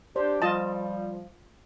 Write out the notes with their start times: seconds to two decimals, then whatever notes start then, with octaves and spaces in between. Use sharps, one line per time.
0.16 D4 G4 C5
0.42 F3 G3 F4 D#5 A5